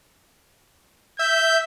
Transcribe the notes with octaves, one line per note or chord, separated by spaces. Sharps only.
E5 G6